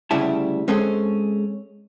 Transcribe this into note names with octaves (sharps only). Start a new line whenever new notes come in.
D2 C#3 G3 E4 A5
G#3 C4 C#4 G#4 A4